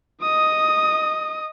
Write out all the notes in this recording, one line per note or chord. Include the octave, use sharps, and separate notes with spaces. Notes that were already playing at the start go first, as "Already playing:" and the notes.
D#5 D#6